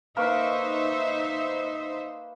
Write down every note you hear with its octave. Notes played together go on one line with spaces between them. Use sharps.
A#3 D#4 B4 C5 E5 C#6